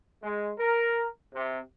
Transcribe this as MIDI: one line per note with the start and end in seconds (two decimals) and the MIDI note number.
0.23 0.52 56
0.58 1.05 70
1.34 1.59 48